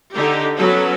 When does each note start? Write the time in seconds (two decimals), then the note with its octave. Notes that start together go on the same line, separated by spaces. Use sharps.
0.14 D3 D#4 G4
0.58 F#3 B3 C#4 F#4 A4 B4